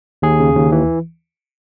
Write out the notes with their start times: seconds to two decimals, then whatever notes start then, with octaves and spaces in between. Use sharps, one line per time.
0.22 D#2 G#4
0.40 C#3
0.56 D#2
0.72 E3